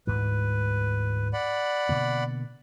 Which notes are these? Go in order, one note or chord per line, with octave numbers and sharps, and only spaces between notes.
D2 G#2 E3 B4
D5 F#5 B5
B2 D3 A#3